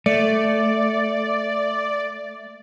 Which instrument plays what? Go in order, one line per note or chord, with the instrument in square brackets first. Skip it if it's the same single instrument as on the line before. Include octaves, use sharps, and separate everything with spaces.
[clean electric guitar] A3 [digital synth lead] D5